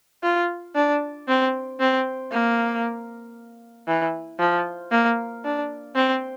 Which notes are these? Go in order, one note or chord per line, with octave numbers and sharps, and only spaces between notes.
F4
D4
C4
C4
A#3
E3
F3
A#3
D4
C4